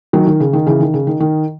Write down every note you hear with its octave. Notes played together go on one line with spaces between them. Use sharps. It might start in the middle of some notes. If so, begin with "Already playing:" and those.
D#3 F#3
D#3
C#3
D#3
C#3 E3
D#3
C#3
D#3
D#3